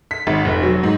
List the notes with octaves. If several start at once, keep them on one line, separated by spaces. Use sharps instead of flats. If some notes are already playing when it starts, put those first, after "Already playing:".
B6
G#1
F1
F#3
G#2